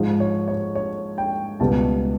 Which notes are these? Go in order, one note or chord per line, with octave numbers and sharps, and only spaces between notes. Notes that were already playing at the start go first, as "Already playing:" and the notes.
Already playing: G#2 F3 G#3
C#5
C#5
C#5
G5
C#2 B2 G3 B3 A5